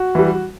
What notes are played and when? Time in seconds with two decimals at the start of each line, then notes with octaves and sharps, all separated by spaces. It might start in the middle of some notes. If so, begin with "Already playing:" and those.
Already playing: F#4
0.15 E3 G3